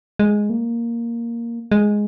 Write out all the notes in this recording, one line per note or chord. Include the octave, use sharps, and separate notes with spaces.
G#3
A#3
G#3